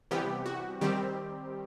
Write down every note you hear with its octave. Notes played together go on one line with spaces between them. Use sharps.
C3 E3 G3 B3 G4
F#4
D#3 G3 C4 G4